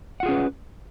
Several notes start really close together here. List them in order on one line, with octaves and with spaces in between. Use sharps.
F#5 F4 G#4 C#4 B4